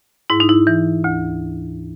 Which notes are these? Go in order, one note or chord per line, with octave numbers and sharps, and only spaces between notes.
G#2 E4
D#4
E4
E3
D2